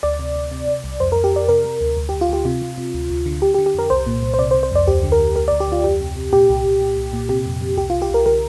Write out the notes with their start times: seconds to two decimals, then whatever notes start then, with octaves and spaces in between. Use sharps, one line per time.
0.03 D2 D5
0.19 C3
0.36 D2
0.51 C3
0.68 C3
0.84 C2
1.00 F2 C5
1.12 A#4
1.16 F2
1.24 G4
1.32 F2 D5
1.49 C3 A#4
1.64 C3
1.81 D2
1.97 D2
2.09 G4
2.13 D2
2.21 F4
2.29 D2 G4
2.45 C3 F4
2.62 C3
2.78 C3
2.94 D2
3.10 D2
3.26 D3
3.42 D3 G4
3.54 G4
3.58 D3
3.66 G4
3.74 F2 A#4
3.90 C2 C5
4.06 A#2
4.23 C2
4.34 C5
4.39 C3 D5
4.51 C5
4.55 C3
4.63 C5
4.71 F2 D5
4.87 D2 G4
5.03 D3
5.12 A#4
5.20 D2
5.36 D2 A#4
5.48 D5
5.51 D2
5.60 G4
5.68 D2 F4
5.84 F2 G4
6.00 C3
6.16 C3
6.33 A#2 G4
6.49 C2
6.65 C2
6.81 A#2
6.97 C2
7.13 A#2
7.29 C3 G4
7.45 F2
7.61 C3
7.77 C2 G4
7.90 F4
7.94 C2
8.02 G4
8.10 C2 A#4
8.26 D3 A#4